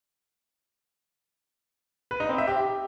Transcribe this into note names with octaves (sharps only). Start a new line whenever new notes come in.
B4
D#4
C4
E5
G4